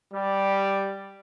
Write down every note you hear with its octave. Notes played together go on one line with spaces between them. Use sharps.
G3 D5